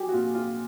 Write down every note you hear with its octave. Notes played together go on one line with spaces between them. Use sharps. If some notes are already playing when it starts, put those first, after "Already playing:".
Already playing: F#3 G4 G#4
F#4
A#2 F4
F4